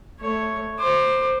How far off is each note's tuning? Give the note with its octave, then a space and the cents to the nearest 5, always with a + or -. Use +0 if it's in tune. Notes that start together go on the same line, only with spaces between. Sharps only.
A3 +0 C#5 +0
C5 +0 D6 +25